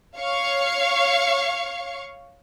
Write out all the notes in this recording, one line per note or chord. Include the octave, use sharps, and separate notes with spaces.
C#5 F5 C#6